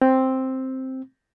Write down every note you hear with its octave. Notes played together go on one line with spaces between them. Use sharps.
C4